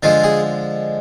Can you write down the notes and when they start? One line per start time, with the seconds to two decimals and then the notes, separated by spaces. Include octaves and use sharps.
0.03 D3 F3 G#3 F4
0.23 G#4